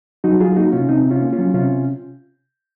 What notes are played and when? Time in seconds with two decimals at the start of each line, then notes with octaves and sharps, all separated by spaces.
0.24 F#3 D#4 F#4
0.40 F#3 F4 G#4
0.56 A#3 D#4 F#4
0.72 C3 C#4 F4
0.89 C3 C4 D#4
1.05 C3
1.11 C#4 F4
1.22 A#3
1.32 C#4 F4
1.38 F#3
1.54 C3 C#4 F4